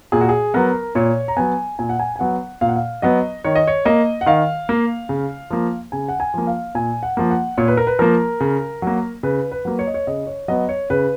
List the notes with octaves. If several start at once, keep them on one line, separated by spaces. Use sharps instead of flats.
A#2 G#4
F#4
G#4
F#3 B3 A#4
A#2 C#5
A#5
F#3 B3 G#5
A#2 G#5
F#5
G#5
G#5
F#3 B3 F#5
A#2 F5
F#5
F5
F#3 B3 D#5
D#3 C#5
D#5
C#5
A#3 D#5
F#5
D#3 F5
A#3
C#3
F3 A#3
C#3 G#5
F#5
G#5
F3 A#3
F5
A#2 G#5
F#5
F3 A#3
F#5
A#2 C#5
B4
A#4
B4
F3 A#3 A#4
C#3
F#3 A#3
C#3 B4
B4
F#3 A#3
C#5
D#5
C#5
C#3 D#5
C#5
F#3 B3 D#5
C#5
C#3 B4